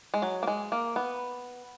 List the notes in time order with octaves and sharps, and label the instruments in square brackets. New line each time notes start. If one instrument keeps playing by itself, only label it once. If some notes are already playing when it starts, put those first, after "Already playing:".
[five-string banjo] G#3
F#3
A#3
G#3
A#3
B3